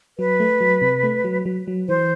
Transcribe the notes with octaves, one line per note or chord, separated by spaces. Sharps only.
F#3 B4
A3
F#3
C3
A3
F#3
F#3
F#3
E3 C5